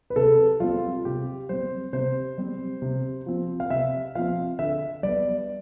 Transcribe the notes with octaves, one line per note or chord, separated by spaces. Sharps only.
B4
C3 A4
G3 C4 F4
C3 G4
G3 C4 C5
C3 C5
G3 C4
C3
F3 C4
F5
C3 E5
F3 C4 F5
D3 E5
G3 B3 D5